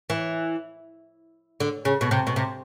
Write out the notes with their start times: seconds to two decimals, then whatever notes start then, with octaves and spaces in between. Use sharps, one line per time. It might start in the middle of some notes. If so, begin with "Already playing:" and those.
0.10 E3
1.60 D3
1.85 C#3
2.01 B2
2.11 C3
2.27 B2
2.36 C3